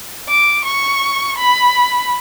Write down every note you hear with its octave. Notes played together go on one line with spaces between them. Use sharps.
D6
C#6
B5